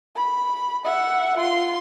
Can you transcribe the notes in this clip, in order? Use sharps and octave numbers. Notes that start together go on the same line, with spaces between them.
B5
E5 F#5
F4 C6